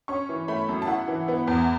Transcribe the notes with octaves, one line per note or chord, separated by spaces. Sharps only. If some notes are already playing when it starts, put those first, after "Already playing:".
C#4 C#6
E3
A3 B5
F#2
A5
E4 F#5
E3
B3
E2